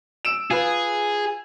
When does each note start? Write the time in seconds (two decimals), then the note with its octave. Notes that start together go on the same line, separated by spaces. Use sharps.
0.25 E6 D7 E7
0.51 F4 G#4 B4